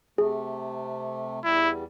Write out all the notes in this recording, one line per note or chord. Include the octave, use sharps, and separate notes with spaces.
C3 A3 G#4
E2 G3 E4